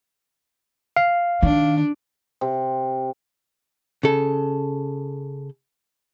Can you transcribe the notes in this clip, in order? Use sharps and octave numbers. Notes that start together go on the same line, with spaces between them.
F5
D#3 D4
C3
C#3 A4